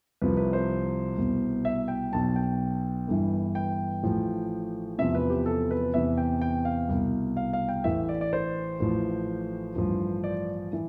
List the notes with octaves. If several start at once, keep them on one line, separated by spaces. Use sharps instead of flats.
C2 C3 F3 B4
B4
C5
C2 B2
E5
G5
B1 B2 A5
G5
G1 G2 E3
G5
A1 A2 F3
E2 C3 F3 E5
B4
G4
A4
B4
E2 C3 E3 E5
G5
G5
F5
C2 B2
F5
F5
G5
A1 A2 E3 E5
D5
D5
C5
A1 A2 F3
A1 G2 F3
D5
E3